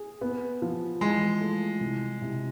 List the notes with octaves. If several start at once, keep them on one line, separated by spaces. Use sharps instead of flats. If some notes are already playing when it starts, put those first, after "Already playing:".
Already playing: G#4
B3
F3
E3 G#3
A3
C2
C3